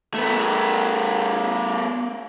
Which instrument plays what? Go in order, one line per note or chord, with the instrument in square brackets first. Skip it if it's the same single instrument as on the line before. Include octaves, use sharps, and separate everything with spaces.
[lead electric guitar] A3 B3